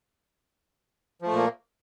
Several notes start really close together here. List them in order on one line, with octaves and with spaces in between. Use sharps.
F3 A3 A#2 A#3